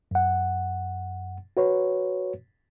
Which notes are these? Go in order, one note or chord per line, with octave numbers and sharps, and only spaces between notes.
F#2 F#5
F#4 B4 C#5